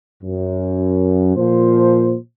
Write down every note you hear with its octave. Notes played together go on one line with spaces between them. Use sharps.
F#2
A#2 F3 C5